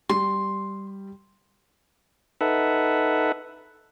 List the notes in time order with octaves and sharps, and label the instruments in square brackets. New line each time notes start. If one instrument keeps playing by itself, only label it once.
[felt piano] G3 [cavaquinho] C6
[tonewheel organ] D#4 A4 B4 E5 F#5